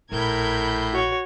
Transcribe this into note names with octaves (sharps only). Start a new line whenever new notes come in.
A#1 A2 A#4 B5 G6 G#6
F#4 C#5